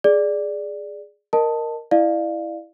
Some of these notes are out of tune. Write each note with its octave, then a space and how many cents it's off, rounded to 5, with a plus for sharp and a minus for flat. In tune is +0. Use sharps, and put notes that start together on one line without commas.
G#4 +0 D5 +0
A#4 +0 D#5 -15 A5 +5
E4 +0 D5 +30 F5 +0